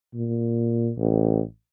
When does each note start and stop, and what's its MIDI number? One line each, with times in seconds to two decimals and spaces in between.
0.14 0.91 46
0.98 1.41 33